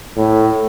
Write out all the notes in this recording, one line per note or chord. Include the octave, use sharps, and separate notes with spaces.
A2